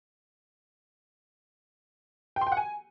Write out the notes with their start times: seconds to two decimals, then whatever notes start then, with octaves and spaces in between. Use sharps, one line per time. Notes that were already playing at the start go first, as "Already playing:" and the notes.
2.36 G5
2.41 C6
2.47 G5
2.52 F#5
2.57 G#5